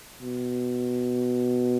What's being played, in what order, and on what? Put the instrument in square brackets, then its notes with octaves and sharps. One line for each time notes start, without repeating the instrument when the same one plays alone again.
[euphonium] B2